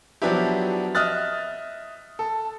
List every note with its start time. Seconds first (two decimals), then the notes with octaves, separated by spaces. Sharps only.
0.22 F3 F#3 B3 D4 E4 G4
0.95 D#5 E5 D#6 F6 F#6 A6
2.19 A4